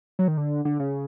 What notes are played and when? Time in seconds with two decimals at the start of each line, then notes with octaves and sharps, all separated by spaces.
0.19 F#3
0.28 D#3
0.37 D3
0.65 D3
0.79 C#3